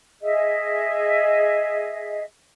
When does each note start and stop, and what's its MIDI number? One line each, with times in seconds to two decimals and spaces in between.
0.21 2.23 68
0.21 2.23 75
0.21 2.23 76